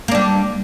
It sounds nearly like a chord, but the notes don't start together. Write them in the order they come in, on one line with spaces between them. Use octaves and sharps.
A#3 D4 G3